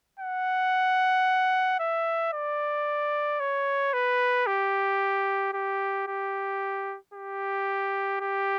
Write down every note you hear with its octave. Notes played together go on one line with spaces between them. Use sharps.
F#5
E5
D5
C#5
B4
G4
G4
G4
G4
G4